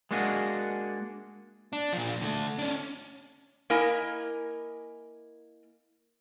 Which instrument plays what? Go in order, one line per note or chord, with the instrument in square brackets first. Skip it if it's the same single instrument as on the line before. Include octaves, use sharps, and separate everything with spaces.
[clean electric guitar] G#3 A#3 D4 F#4 G#4
[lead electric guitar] D4
A#2 F3
D3 A3
C#4 D4
[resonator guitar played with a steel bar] A#3 E4 A#4 D#5 G#5